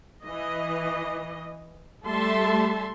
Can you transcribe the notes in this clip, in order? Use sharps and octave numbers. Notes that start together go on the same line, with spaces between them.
E3 D#5
G3 A3 A4 E5 A5 C6